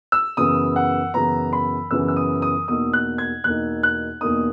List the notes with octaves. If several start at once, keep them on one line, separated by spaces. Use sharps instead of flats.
E6
F#2 C#3 E3 B3 D#6
F#5
F#2 C#3 E3 B3 A#5
B5
F#2 C#3 E3 B3 E6
E6
D#6
D#6
E2 B2 A#3 D#4 D#6
F#6
G#6
E2 B2 A#3 D#4 F#6
F#6
E2 B2 A#3 D#4 D#6